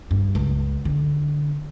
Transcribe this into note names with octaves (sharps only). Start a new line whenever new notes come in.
G2
C#2
D3